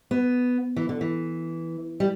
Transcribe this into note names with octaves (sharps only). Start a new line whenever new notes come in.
B3
E3
D3
E3
G3